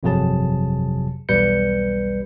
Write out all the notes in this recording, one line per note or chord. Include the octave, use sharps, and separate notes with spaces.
G1 F2 C3 F#3 G#4 A5
B1 E2 G3 B4 G6 C#7